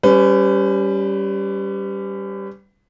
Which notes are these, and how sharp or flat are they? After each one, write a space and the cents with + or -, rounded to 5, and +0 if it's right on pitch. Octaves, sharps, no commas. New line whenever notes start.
G3 +0 C#4 +15 B4 +35